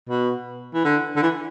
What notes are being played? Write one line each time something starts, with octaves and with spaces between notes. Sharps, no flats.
B2
E3
D3
D3
E3